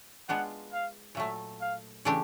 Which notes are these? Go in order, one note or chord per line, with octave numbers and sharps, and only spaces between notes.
G#3 B3 D4 F4 F#5
F5
A#2 F#3 A3 E5
F5
C#3 E3 A3 D4 G4